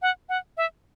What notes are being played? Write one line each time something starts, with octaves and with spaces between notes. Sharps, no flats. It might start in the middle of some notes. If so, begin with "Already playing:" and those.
F#5
F#5
E5